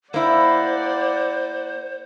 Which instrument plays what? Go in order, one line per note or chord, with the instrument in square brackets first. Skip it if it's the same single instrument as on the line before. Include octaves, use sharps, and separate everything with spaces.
[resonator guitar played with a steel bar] A#3 E4 [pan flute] C5 [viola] D5 F#5